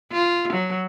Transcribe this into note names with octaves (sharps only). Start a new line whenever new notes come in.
F4
F#3